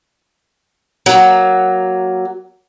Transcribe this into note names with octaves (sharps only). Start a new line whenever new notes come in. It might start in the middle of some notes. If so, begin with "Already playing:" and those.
F#3 A#3